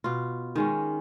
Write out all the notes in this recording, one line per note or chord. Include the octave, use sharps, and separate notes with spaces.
B2 F4
D#3 G#3 C#4